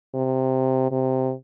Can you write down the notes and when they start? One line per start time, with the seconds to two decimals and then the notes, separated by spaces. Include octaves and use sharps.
0.14 C3
0.92 C3